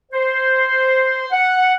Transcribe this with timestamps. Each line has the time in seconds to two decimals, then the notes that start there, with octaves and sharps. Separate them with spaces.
0.12 C5
1.32 F#5